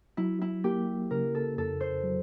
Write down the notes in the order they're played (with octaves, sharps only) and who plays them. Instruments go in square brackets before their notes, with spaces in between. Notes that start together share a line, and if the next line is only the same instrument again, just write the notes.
[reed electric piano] F#3 [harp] E4
[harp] E4
[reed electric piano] A#3 [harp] G4
[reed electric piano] C#3 [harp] A#4
[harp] A4
[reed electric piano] F2 [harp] A4
[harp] C5
[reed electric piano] F#3